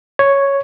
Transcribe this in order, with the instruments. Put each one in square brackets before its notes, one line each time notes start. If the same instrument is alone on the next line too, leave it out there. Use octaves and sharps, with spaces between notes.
[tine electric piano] C#5